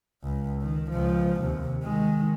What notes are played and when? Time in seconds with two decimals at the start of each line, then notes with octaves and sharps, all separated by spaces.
0.24 C#2
0.62 D#3
0.91 C#2 F3
1.41 D#2 C3
1.83 D#3 G#3